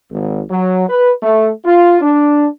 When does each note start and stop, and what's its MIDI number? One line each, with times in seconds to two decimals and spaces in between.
0.11 0.41 32
0.50 0.83 54
0.88 1.11 71
1.23 1.50 57
1.65 1.97 65
2.01 2.46 62